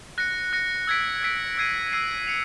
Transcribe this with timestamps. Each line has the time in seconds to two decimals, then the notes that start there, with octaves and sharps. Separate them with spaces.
0.18 F#6 A#6 C#7
0.53 F#6 A#6 C#7
0.87 E6 G#6 B6 D7
1.23 E6 G#6 B6 D7
1.57 E6 G#6 C7 D#7
1.93 E6 G#6 C7 D#7
2.27 C#7 F7